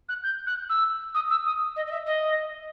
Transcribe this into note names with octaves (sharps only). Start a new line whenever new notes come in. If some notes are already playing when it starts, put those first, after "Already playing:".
F#6
G6
F#6
E6
D#6
E6
D#6
D#5
D#5
E5
D#5